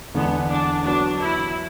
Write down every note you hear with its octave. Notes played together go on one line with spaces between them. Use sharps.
E2 D3 G#3 B3 D4
D4
F#3 B3 D4 F#4
E4